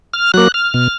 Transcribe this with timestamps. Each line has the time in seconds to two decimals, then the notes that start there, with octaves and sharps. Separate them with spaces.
0.14 F6
0.34 F#3 A#3 F#6
0.54 F6
0.74 B2